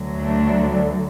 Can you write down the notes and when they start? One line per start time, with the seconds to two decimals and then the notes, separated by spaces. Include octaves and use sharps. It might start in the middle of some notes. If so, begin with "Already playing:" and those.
Already playing: D2 D3 F#3
0.18 A3 D4